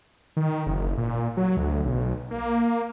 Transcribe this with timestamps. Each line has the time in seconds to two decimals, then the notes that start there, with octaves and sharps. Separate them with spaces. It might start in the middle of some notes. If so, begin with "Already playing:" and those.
0.37 D#3
0.66 F#1
0.98 A#2
1.37 F#3
1.57 D2
1.85 B1
2.31 A#3